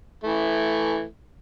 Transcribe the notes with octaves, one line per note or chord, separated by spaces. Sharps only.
E3 A3